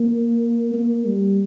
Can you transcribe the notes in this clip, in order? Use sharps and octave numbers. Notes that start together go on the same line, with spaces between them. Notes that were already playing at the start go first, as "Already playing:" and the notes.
Already playing: A#3
A#3
G3